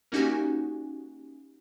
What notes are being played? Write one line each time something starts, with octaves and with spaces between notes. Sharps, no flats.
A#3 C#4 D#4 F#4 G4 G#5